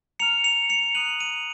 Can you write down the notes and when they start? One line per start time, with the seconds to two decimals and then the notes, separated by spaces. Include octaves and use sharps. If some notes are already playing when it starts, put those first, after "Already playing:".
0.19 A#5 F6 C#7 F7
0.44 C#7 F7
0.70 C#7 F7
0.95 A#5 D#6 F#6 D#7 F#7
1.20 D#7 F#7